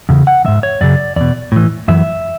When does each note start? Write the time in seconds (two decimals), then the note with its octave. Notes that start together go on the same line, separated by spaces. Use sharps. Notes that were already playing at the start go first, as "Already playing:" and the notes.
0.09 E2 C#3
0.27 F#5
0.45 G#2 E3 E5
0.63 C#5
0.81 F#2 C#3 D5
1.16 E2 B2 D5
1.52 A2 E3
1.88 F#2 E3 E5